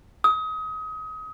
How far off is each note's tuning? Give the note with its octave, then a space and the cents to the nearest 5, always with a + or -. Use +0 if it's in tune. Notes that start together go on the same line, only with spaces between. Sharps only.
D#6 +30